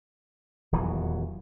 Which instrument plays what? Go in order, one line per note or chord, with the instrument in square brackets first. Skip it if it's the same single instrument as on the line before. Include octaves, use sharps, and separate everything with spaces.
[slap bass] D#1 E2 E3 F#3